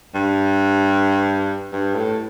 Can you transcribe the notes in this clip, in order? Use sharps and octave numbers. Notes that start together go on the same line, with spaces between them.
G2
G2
A2